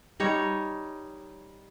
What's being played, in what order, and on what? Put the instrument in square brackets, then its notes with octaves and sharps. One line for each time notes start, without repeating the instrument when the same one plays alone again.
[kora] G3 D#4 C#5